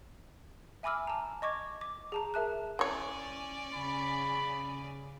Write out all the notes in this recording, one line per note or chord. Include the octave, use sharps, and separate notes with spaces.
E5 G#5 B5 D6 E6 F6
A5 A#5
D#5 C#6 D6 G#6
D6
G#4 A5 A#5
A#4 E5 A5 F#6
E3 C#4 C#5 D5
C#3 B5